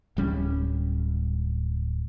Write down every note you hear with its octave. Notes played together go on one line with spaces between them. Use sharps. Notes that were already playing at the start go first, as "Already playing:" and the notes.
D1 G3 C#4